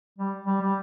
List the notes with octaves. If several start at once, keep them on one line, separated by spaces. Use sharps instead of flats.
G3
G3
G3